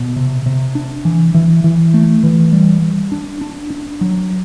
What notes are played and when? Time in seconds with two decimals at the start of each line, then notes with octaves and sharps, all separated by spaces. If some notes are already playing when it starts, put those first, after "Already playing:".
Already playing: B2
0.16 C3
0.46 C3
0.75 D4
1.05 E3
1.34 E3
1.64 E3
1.94 A3
2.24 E3
2.52 G3
2.82 G3
3.12 D4
3.41 D4
3.70 D4
4.01 F#3